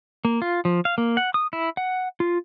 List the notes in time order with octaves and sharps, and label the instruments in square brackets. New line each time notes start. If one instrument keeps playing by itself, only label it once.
[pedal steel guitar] A#3
F4
F3
F5
A#3
F#5
D#6
E4
F#5
F4